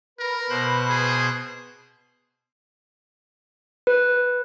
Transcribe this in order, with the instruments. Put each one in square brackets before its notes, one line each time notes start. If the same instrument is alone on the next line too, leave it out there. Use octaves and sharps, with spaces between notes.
[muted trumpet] A#4 [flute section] B4 B5
[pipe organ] B2 C5 F#6
[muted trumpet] G#4
[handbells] B4